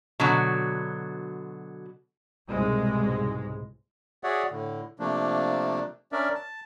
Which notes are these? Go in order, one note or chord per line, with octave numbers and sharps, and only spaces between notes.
B2 D3 F#3
C2 G#2 B2 G#3
F#4 G#4 C#5 D5 E5 F#5
A2 D3
C3 F3 A3 A#3 D4
C#4 D4 A#4 D5 E5
A5